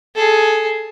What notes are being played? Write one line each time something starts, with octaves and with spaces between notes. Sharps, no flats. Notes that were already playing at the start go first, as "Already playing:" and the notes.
G#4 A4